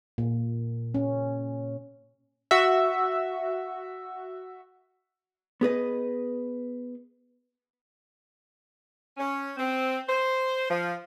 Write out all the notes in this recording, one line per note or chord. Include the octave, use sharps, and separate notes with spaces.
A#2
C#4
F#4 E5
B3 G#4 B4 D#5
C#4
C4
C5
F3